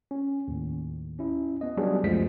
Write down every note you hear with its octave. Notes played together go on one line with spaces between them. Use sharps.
C#4
D#2 A2
C#4 E4
B3 D#5
F#3 G3 B3 D4 G#4
C#2 F#2 F3 G#3 A3 B6